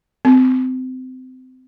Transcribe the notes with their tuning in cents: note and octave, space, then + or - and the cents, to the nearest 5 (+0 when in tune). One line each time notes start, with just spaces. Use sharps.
C4 -30